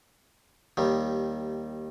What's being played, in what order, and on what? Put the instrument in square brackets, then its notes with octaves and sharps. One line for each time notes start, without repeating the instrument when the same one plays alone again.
[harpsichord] D#2 D#3 G3